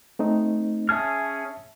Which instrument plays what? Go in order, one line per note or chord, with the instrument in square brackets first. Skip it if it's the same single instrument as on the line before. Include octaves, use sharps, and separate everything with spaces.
[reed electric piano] A3 C4 D#4
[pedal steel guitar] C#4 G#4 F6 [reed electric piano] E5 A5 G#6